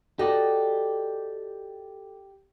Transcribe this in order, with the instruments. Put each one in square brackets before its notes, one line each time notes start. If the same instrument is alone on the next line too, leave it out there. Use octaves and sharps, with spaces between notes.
[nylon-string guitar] F#4 A4 D#5 [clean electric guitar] G4 D5